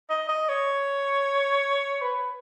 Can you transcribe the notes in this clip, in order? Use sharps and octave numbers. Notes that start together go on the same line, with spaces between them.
D#5
D#5
C#5
B4